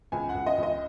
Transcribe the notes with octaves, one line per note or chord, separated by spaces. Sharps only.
C#2 G#5
F#5
C#2
D#5
C#2
D#5